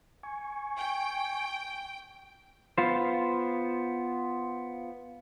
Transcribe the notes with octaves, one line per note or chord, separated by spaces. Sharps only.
G#5 C#6
G5
B3 F4 C5